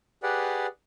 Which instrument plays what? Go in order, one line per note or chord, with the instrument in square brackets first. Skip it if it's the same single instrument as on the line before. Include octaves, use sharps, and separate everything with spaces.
[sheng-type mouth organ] G4 G#4 B4 D5 F#5